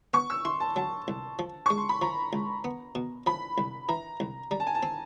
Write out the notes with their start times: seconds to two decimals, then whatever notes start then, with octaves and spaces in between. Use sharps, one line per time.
0.14 B3 C#6
0.30 E6
0.45 E4 C6
0.60 A5
0.76 F#3 A5
1.08 C2
1.39 F3
1.66 G#3 C#6
1.77 C6
1.89 B5
2.02 F3 A#5
2.33 C#2
2.64 B3
2.95 B2
3.26 F3 B5
3.58 C2
3.88 E3 A#5
4.20 C2
4.51 G3 A#5
4.60 A5
4.67 G#5
4.75 A5
4.83 C4